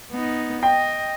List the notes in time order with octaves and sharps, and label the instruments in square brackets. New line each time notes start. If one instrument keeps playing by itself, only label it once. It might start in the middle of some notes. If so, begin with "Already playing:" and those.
[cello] B3 D#4
[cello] D#5 [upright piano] G5